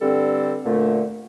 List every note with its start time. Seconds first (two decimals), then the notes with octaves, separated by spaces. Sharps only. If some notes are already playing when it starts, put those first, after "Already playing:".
0.02 G2 D3 G3 C4 A4
0.65 D2 A#2 D3 A3